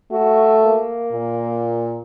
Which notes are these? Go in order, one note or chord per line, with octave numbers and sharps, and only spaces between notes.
A3 F#4
A#3
A#2